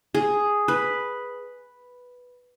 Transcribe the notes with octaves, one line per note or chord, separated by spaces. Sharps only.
G#4
B4